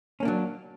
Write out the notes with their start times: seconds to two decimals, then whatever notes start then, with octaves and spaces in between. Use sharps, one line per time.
0.20 C#4
0.23 A#3
0.25 D4
0.28 F#3